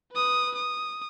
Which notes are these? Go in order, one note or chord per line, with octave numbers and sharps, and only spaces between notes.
B4 D#6
D#6